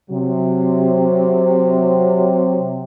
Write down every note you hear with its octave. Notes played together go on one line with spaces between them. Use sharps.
C3 F#3